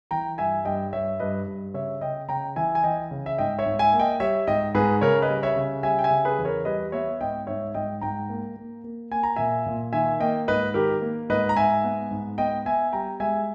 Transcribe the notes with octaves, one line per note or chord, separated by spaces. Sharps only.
E3 G5 A#5
G2 E5 G#5
G2 D#5 G5
G2 C#5 E5
G2 B4 D#5
G2
C#3 C#5 E5
C#3 D#5 G5
C#3 G5 A#5
E3 E5 G#5
G#5
E3 D#5 G5
C#3
E5
G#2 D#5 G5
C#5 E5
G#2
E5 G#5
A#3
D#5 G5
G3 C#5 E5
G#2 D#5 G5
G#2 G#4 B4
C#3 A#4 C#5
B4 D#5
G3
C#5 E5
C#3
G3 E5 G#5
G5
E5 G#5
C#3
G#4 B4
E2
A#4 C#5
G3 B4 D#5
B3 C#5 E5
G#2 D#5 G5
G#2 C#5 E5
G#2 D#5 G5
G#2 G5 A#5
A#3
A#3
A#3
A#3 G#5
A#5
A#2 E5 G#5
A#2
D#3 E5 G#5
A#3 D#5 G5
G#2 B4 D#5
D#3 G4 A#4
A#3
G#2 B4 D#5
A#5
G#2 E5 G#5
B3
G#2
B3 D#5 G5
B3 E5 G#5
G3 G5 A#5
G#3 E5 G#5